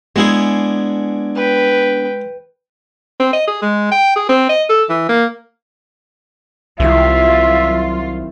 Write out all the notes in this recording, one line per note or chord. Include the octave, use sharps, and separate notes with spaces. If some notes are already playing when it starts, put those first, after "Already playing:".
G#3 B3 D4 E4 G#4
B4 G5
C4
D#5
G#4
G#3
G5
G#4
C4
D#5
A4
E3
A#3
C2 D#3 F#3 C4 E4 F4 E5